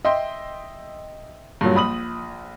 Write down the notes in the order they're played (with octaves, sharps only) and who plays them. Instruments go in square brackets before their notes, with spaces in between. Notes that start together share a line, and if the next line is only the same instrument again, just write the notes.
[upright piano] D#5 E5 G5 C6
G2 A#2 F#3
A#1 B5 D#6 F#7